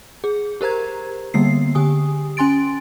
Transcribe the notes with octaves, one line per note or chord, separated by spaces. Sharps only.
G#4
G4 A#4 C5 A#5 G#6
D3 G3 A#3 B3 C7
D3 G4 G#5 D#6
C#4 G#5 C6 A6 D7